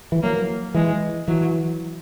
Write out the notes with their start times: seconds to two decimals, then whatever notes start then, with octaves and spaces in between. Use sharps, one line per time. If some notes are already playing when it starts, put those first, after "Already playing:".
0.12 E3
0.22 F#3 A#3
0.74 E3 G#3
1.27 E3 F#3